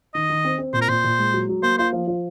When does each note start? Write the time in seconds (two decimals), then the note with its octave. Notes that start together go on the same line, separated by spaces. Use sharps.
0.14 D#3 D#5
0.30 D#3
0.45 C4
0.58 C4
0.73 A#2 C5
0.81 A#4
0.88 A#2 C5
1.04 A#2
1.19 G#3
1.34 F#3
1.49 F#3
1.63 A#3 C5
1.78 F4 C5
1.93 F3
2.07 F3